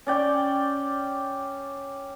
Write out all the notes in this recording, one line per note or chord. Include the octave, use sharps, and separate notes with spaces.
C#4 D5 G5